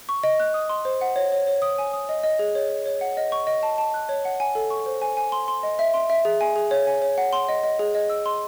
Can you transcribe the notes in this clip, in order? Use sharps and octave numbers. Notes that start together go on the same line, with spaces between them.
C#6
D#5
F#6
D#6
C6
C5
F#5
C#5
C#5
C#5
D#6
G#5
D#6
D#5
D#5
G#4
C#5
C#5
C#5
F#5
D#5
C#6
D#5
A5
A5
F#6
C#5
F#5
G#5
A4
C#6
C5
G#5
G#5
C6
C6
D#5
E5
C6
E5
G#4
G#5
G#4
C#5
G#5
C#5
F#5
C6
D#5
D#5
G#4
D#5
E6
C6